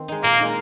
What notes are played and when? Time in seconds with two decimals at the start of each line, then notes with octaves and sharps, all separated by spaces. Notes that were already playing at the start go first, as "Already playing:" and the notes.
Already playing: D#3 C4
0.08 G#3 D#4
0.23 A#2 A#3
0.40 G#3 D#4